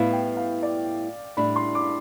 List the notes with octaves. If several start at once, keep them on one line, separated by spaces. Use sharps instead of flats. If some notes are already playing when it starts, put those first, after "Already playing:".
Already playing: A2 G3 B3 E4 F5
G5
F5
D5
A2 G3 D4 B5
C6
D6